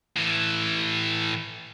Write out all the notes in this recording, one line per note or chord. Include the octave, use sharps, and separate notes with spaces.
A2 E3